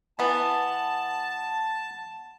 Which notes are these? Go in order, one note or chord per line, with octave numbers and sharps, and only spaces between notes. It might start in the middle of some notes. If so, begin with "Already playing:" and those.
E3 B3 A5